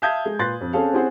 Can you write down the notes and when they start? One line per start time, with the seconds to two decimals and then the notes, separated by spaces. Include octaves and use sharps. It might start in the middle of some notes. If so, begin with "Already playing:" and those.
0.02 E5 F5 A5 D#6 G6 G#6
0.25 G#3
0.39 A#2 B4 C6 F#6 A6
0.61 F2
0.73 C4 C#4 G#4 A4 F5
0.93 C4 C#4 E4 G#4 C5 F#5